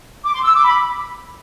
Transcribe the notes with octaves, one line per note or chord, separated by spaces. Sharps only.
D6
C6
E6
D6
B5